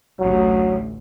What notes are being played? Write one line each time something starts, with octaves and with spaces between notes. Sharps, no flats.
A1 D2 F#3